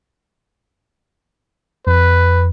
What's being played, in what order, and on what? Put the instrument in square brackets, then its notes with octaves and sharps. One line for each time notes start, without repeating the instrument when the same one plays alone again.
[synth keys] F2 [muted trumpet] B4